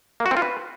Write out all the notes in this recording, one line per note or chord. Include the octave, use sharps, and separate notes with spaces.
A#3
F#4
C4
F4
B4